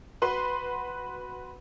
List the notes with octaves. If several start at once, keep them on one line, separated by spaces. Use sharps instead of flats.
F#4 B4 C6